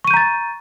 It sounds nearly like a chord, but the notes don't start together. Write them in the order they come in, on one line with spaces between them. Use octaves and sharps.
C#6 D#7 G6 A#5 A6